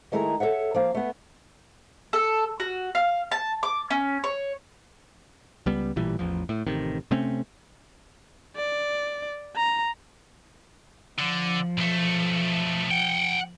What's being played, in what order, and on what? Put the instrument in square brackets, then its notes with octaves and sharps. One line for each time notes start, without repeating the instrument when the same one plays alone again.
[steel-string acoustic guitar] D#3 G#3 A3 E4 G#4 A#5
A4 C#5 E5 F#5
F3 A#3 F5
A3 B3
[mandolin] A4
F#4
F5
A5
D6
C#4
C#5
[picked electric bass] C#2 G3 B3
A1 A#2 E3 G3
A1 E2 F3
A2
A1 C3 D#3
C3 A3 C4 C#4
[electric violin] D5
A#5
[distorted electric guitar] D3 [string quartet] F3
[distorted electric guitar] B1 A3
F#5 G5